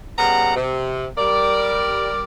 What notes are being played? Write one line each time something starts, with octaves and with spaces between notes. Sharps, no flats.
C#3 G3 B3 F#5 A#5
C3
G3 A#4 D5